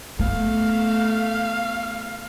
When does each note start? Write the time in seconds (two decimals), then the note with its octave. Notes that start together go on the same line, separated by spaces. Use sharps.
0.19 A3 B3 F5